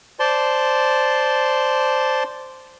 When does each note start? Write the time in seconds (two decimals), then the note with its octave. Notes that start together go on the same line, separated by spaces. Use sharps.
0.20 C5 D5 A5 C6